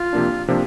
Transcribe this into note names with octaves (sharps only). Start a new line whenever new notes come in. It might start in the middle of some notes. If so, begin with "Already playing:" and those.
Already playing: F4
C3 F3 A#3 D4
C3 F3 A#3 D4